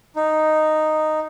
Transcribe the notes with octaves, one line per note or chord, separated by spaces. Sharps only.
D#4